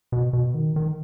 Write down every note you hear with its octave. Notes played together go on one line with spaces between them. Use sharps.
B2
B2
D#3
D#3